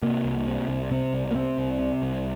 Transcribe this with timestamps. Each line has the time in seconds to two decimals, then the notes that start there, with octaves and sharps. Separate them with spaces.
0.03 C3 A#3
0.25 C2
0.47 C3
0.68 C2
0.91 C3 C4
1.13 C2
1.31 A#3
1.35 C3 C4
1.58 C2
1.79 C3
2.02 C2